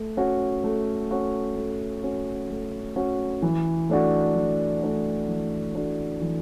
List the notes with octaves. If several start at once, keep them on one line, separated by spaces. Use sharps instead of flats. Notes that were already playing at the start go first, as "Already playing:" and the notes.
Already playing: A3
C#4 F#4
A3
C#4 F#4
A3
C#4 F#4
A3
C#4 F#4
E3
A3 D4 F#4
E3
A3 D4 F#4
E3
A3 D4 F#4
E3